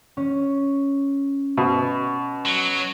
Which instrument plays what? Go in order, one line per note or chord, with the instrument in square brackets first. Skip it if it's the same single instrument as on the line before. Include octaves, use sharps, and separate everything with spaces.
[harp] C#4
[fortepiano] B2
[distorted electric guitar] F#3